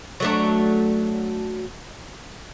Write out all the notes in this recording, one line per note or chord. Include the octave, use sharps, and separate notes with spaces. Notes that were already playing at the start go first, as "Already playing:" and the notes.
F#3 A3 D4